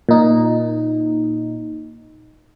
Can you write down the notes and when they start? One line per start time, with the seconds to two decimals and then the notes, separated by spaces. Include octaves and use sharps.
0.09 A#2 D#4